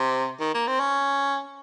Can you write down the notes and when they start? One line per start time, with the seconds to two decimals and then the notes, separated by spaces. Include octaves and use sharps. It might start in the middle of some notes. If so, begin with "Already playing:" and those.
Already playing: C3
0.40 D#3
0.54 A#3
0.67 C4
0.80 C#4